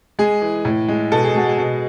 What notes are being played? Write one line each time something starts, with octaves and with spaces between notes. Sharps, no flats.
G#3 G#4
E3
A2
G#3
B2 A4
G#4
G#3 F#4
G#4
B2